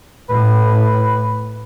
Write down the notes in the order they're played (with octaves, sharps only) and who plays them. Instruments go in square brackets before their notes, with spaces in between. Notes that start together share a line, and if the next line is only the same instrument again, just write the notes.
[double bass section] A2 [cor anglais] B4